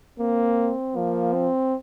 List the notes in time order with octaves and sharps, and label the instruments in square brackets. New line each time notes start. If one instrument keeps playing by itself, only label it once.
[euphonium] A#3 [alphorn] C4
[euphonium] F3 [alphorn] A#3
[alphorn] C4